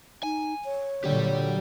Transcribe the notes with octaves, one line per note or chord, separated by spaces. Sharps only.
D#4 G#5
C#5
A#2 D3 F#3 G4 D5